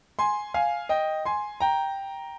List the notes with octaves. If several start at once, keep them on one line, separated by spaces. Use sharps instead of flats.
G#5 C6
F5 G#5
D#5 G5
G#5 C6
G5 A#5